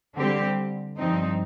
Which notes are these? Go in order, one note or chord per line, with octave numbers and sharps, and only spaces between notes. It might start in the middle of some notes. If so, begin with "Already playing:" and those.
D3 G3 C4 G4
G2 F3 C4 D#4